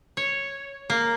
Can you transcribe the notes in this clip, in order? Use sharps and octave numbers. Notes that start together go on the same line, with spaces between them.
C#5
A#3